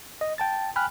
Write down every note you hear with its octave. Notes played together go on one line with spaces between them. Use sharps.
D#5
G5 A5 A6
G5 G#5 B5 F6 F#6